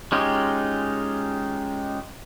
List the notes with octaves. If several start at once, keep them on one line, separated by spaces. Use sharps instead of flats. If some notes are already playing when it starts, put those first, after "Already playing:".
G#3 C#4 D#4 F4 G4